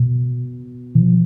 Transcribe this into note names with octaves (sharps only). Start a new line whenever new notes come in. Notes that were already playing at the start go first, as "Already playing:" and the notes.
Already playing: B2
E3
F3